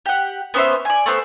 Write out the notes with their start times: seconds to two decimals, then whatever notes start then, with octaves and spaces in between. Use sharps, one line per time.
0.06 G4 F#5
0.54 B3 C#4 C5 E5
0.85 D5 G#5
1.06 A3 B3 C5